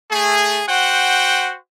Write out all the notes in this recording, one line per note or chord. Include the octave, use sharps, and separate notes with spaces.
A3 G#4
F#4 C5 F#5 G5